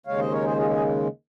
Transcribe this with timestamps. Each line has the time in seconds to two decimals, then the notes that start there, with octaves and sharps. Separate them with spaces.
0.06 D#2 C#3 G#3 C#5 F5
0.19 C5 D#5
0.32 A#4 C#5
0.44 G#4 C5
0.57 F4 G#4
0.70 G#4